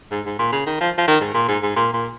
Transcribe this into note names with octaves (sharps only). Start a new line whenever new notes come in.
G#2
G#2
A#2
C#3
D#3
F3
F3
D#3
G#2
A#2
G#2
G#2
A#2
A#2